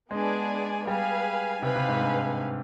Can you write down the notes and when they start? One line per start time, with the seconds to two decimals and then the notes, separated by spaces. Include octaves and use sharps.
0.11 G#3 B3 D4 G#4 D5 G#5
0.87 G3 G#4 B4 F5 G#5
1.62 C3 D#4 B4 F5 G#5
1.76 C3
1.88 G#2
2.01 G2